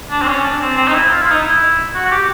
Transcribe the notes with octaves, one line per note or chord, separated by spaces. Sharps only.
D4
C4
C#4
D4
C4
C4
D#4
E4
F4
E4
D#4
E4
F#4
F#4
G4